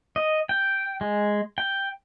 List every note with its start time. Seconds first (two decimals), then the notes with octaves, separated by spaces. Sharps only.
0.16 D#5
0.49 G5
1.01 G#3
1.58 G5